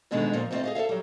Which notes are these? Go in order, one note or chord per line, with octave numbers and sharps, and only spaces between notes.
G#2 B2 D3 D#3 G#3 A3
A#2 F3
D2 G3 A3 C4 F4 D#5
G#4 D#5 F5
A4 C#5 E5 F5
F#3 G3